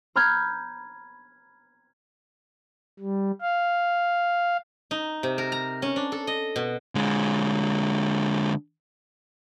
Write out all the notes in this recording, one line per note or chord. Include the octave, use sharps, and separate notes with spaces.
A#5 B5 F6 G6 G#6
G3
F5
D#4
C3
A#4
A#5
C#4
D4
A4
D#5
B2
D3 G#3